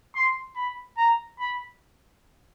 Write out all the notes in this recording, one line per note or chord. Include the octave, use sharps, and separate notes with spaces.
C6
B5
A#5
B5